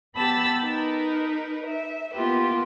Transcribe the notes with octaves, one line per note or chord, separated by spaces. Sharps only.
B3 G4 A5 B5 E6 A6
D#4 A#4 B4
E5
A#3 B3 F4 G4 B4